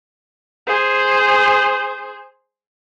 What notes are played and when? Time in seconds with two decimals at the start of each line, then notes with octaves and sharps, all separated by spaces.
0.67 G#4 C5